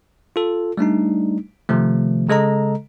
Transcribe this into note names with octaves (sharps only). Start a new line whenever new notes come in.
F4 A4
G3 A3 D4 D#4
C3 D#3 F3 A3
C#3 G#3 A4 D#5 A#5